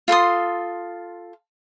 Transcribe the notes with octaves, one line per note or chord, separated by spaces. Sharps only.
F4 A4 C6 D#6